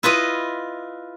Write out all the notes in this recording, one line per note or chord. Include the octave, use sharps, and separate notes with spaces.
E4 F4 B4 D#5